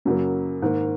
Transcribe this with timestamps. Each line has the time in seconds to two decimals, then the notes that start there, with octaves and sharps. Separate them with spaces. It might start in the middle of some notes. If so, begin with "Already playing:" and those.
0.05 F#2 C#3 F#3 A#3
0.62 G#2 D#3 A#3